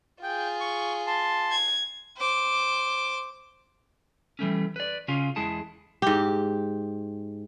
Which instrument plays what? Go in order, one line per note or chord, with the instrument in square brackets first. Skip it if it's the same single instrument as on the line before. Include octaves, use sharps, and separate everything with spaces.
[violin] F4 G#4 [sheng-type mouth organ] G5
[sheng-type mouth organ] C#6
A5 C6
[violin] G#6
[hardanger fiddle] C5 D6
[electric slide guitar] E3 G3 A3 C#4
B4 D5
C#3 C#4 F4 F5
E2 E3 G#3 E4 G#4 A5
[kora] G#2 G4